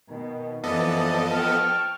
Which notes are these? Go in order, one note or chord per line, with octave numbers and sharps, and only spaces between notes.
B2 D#3
F#2 E3 F3 B3 A4 D5 D#5
G5 A5 C#6 F6